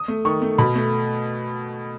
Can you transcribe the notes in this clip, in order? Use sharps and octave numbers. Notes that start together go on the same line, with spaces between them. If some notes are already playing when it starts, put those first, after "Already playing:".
Already playing: D#6
A3
D#3 C#6
A3
B2 B5
A3